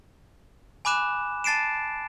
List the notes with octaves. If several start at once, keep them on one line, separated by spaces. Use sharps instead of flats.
G#5 B5 D6 F#6 E7
A5 A6 C7 D7 E7